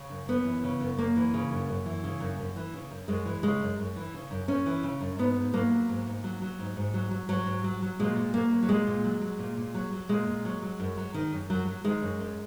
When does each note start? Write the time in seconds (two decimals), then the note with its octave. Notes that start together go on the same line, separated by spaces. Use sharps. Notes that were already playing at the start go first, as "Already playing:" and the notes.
Already playing: C#3
0.10 F#2
0.28 F#2 B3
0.45 E3
0.64 C#3
0.80 F#2
0.97 F#2 A#3
1.16 E3
1.34 C#3
1.51 F#2
1.69 F#2
1.86 E3
2.04 C#3
2.20 F#2
2.39 F#2
2.56 E3
2.74 C#3
2.91 F#2
3.08 F#2 G#3
3.25 E3
3.43 C#3 G#3
3.62 F#2
3.79 F#2
3.96 E3
4.14 C#3
4.31 F#2
4.48 F#2 C#4
4.66 E3
4.83 C#3
5.01 F#2
5.19 G#2 B3
5.36 G#2
5.53 F#3 A#3
5.72 F#3
5.89 G#2
6.06 G#2
6.24 F#3
6.42 F#3
6.59 G#2
6.76 G#2
6.94 F#3
7.11 F#3
7.29 G#2 F#3
7.46 G#2
7.64 F#3
7.82 F#3
7.99 A#2 G#3
8.16 A#2
8.34 F#3 A#3
8.52 F#3
8.63 F#3
8.69 A#2 G#3
8.87 A#2
9.04 F#3
9.21 F#3
9.39 A#2
9.57 A#2
9.74 F#3
9.93 F#3
10.09 A#2 G#3
10.27 A#2
10.45 F#3
10.62 F#3
10.80 F#2
10.97 F#3
11.14 D#3
11.32 F#2
11.50 F#2 F#3
11.67 F#3
11.84 D#3 G#3
12.02 F#2
12.20 F#2